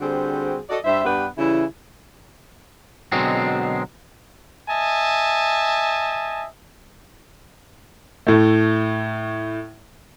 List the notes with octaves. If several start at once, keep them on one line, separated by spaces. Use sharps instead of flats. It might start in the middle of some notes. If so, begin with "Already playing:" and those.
D3 G3 C4 F#4 G#4 C5
F#4 A4 D5 D#5
G2 G3 C5 E5
G2 B3 D4 G4 B4
C#3 E3 G3 E4
B2 D3 F#3 G#3 C4
D#5 E5 G#5 A5
A2 A3